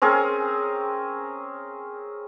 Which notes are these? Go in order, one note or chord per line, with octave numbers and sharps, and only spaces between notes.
C4 C#4 G#4 A#4